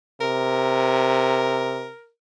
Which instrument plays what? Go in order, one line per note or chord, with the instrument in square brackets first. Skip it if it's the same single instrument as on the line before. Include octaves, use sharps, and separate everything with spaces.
[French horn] C3 [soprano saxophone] A#4